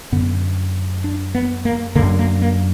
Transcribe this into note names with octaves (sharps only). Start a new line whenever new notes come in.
F#2 D3 B3
D4
B3
A#3
F#2 D3 A#3
A#3
A#3